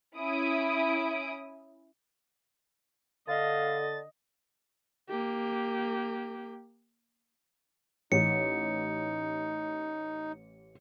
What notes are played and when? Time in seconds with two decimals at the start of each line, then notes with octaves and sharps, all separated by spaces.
0.18 C#4 E4 D#6 D7
3.28 D3 D#5 F5 A6
5.09 A#3 G4
8.12 A1 D#4 C#7